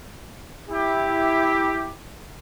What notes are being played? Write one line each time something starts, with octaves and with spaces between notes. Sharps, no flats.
E4 G4